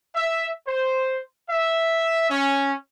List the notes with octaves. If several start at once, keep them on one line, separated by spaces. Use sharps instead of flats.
E5
C5
E5
C#4